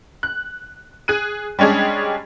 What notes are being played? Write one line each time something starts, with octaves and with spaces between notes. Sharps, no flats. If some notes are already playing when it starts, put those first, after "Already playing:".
F#6
G#4 F#6 D#7
G3 G#3 C#4 D4 G#4